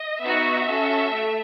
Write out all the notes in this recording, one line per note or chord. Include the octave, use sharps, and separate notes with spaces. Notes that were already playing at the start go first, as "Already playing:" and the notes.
Already playing: D#5
B3 D#4 F#4 E5
C#4 F#4 A4
A3